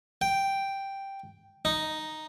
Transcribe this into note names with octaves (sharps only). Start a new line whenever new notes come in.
G5
D#4